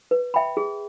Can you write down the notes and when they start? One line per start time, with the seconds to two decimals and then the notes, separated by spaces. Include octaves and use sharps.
0.11 B4
0.34 E5 G5 B5
0.57 G#4